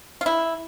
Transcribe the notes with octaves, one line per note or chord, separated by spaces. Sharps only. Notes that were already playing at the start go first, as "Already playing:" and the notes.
F4
E4